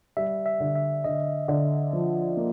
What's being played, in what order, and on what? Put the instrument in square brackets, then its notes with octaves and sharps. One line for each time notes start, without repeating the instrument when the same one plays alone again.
[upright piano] G3 [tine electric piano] E5
[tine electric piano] E5
[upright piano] D3
[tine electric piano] E5
[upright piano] D3 [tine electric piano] D#5
[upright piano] D3
F3
A#3